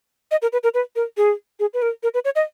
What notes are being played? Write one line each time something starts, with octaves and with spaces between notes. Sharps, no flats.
D#5
A#4
B4
A#4
B4
A#4
G#4
G#4
B4
A#4
A#4
B4
C#5
D#5